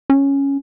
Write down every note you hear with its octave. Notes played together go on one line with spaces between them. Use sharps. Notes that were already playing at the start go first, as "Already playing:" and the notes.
C#4